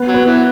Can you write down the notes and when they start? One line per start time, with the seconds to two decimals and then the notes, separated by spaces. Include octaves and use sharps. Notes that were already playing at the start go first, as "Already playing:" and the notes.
Already playing: B3
0.08 F#3
0.14 B3
0.26 E3